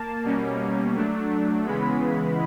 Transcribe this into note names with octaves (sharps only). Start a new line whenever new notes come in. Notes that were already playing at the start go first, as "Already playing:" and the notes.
Already playing: A#3 A5
B2 G3 A#3 C#4
F#3 A3 D4
C#3 E3 G#3 B3 B5